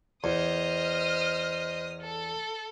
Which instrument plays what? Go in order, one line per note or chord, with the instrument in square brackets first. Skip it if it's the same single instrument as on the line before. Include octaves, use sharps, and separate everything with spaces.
[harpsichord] E2 [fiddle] C5 D#5 [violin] D#6 F6
[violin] A4